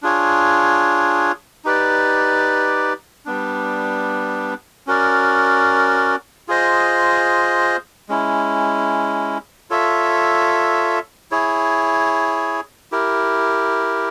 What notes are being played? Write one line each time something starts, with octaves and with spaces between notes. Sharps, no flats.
D4 F4 G#4 C#5
D#4 G4 B4 D5
G3 B3 D4
C#4 F#4 A#4 D5
F4 G#4 C5 D#5
G#3 C#4 E4
F4 A4 C#5 E5
E4 G#4 C#5
E4 G4 A#4